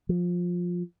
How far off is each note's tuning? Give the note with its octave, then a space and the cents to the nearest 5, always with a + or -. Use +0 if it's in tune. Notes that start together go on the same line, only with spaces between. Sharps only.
F3 +15